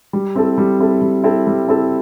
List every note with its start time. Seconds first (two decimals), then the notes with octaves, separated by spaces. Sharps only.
0.13 G3
0.35 C4 E4 A4
0.58 G3
0.80 C4 E4 A4
1.02 G3
1.24 C4 E4 A4
1.47 G3
1.68 C4 E4 A4